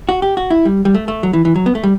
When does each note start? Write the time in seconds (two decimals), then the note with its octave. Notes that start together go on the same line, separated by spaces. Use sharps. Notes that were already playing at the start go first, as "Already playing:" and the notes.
0.09 F#4
0.22 G4
0.37 F#4
0.50 E4
0.65 G3
0.85 G3
0.94 A3
1.08 A3
1.23 F#3
1.33 E3
1.45 E3
1.56 F#3
1.66 B3
1.75 A3
1.83 G3